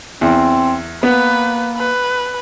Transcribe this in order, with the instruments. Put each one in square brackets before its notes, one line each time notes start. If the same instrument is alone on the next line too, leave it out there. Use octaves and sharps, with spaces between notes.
[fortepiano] E2 [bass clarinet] C4
[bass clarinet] A#3 [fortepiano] B3 [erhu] B4
[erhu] B4